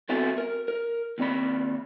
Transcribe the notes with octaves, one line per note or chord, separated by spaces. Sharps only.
B3 C4 F#4 A4 E5 G#5
A#4
A#4
D#2 C4 D5 B5